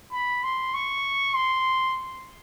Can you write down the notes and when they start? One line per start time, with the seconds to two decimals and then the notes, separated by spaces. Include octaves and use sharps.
0.12 B5
0.44 C6
0.74 C#6
1.35 C6